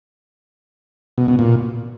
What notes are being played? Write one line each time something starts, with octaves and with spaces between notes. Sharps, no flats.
B2
B2
A#2